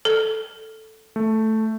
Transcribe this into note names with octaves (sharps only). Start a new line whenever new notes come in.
A4
A3